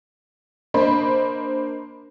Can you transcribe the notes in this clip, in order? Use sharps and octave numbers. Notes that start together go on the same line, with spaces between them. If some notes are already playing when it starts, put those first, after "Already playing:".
A#3 D4 C5 D#5 B5